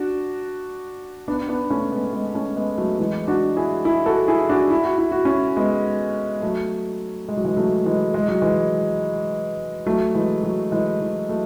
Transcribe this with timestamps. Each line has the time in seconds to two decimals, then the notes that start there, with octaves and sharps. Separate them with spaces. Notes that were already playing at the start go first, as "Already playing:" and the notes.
Already playing: D4 F#4
1.28 B3 D4
1.48 B3 D4
1.70 A3 C#4
1.92 G#3 B3
2.13 G#3 B3
2.34 A3 C#4
2.56 G#3 B3
2.78 F#3 A3
2.99 E3 G#3
3.28 D4 F#4
3.56 E4 G#4
3.85 E4 G#4
4.06 F#4 A4
4.28 E4 G#4
4.49 D4 F#4
4.71 E4
4.84 F#4
4.98 E4
5.12 F#4
5.25 C#4 E4
5.56 G#3 B3
6.42 F#3 A3
7.28 G#3
7.37 F#3
7.45 E3 G#3
7.57 F#3 A3
7.86 E3 G#3
8.14 G#3
8.28 F#3
8.42 E3 G#3
9.86 F#3 A3
10.15 E3 G#3
10.43 F#3
10.72 E3 G#3
11.01 E3
11.29 F#3 A3